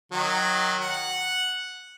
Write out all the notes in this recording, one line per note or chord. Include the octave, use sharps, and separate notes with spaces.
D#3 F#3
F#5